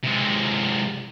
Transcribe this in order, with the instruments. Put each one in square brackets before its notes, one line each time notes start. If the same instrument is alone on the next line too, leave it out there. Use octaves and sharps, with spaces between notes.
[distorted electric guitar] C3 G#3